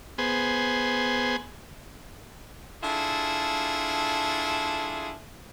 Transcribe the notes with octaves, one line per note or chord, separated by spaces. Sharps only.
B3 G#4 C5
D4 E4 F4 G#4 A4